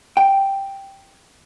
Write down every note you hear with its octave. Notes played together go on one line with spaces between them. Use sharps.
G5